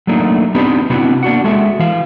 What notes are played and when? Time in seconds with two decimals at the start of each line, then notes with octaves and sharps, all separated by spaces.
0.07 F#3 A3 A#3 D4 D#4
0.55 B3 C4 D4 D#4 G4 B4
0.90 C3 B3 C4 D4 E4 F#4
1.23 A#3 D4 F#4 F#5
1.44 G#3 F#4 A4 E5
1.79 E3 F5